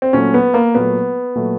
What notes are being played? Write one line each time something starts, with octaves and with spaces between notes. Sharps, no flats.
C4
A#2 F#3 A3 C#4
B3
A#3
A#2 F#3 A3 B3
A#2 F#3 A3